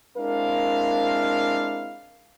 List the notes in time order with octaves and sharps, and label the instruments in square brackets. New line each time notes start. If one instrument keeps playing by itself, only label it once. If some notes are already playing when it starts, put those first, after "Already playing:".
[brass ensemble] G#3 C4 D4 E4 A#4 F5